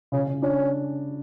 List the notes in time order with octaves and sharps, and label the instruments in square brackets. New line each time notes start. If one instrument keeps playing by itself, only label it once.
[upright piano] C#3 [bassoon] C#4
[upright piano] C#3
[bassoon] C#4 [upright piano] D4